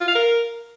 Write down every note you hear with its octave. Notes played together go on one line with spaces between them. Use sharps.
F4
F5
A#4